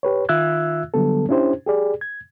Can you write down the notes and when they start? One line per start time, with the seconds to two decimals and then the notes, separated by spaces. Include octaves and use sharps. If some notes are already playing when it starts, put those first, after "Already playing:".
0.03 G4 B4 C#5
0.29 D#3 F4 E5 E6 F#6 G#6
0.94 D3 F#3 G3 B3 A4
1.29 C#4 D4 E4 G4 C5
1.66 G4 G#4 D5
2.01 G#6